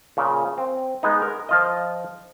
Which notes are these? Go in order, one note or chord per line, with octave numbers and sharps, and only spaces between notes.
A#2 C#3
C4
G#3 B3 D#4
A#4
F3 F4 D#5